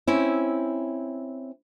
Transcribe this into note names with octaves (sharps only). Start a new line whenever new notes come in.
C4 C#4 E4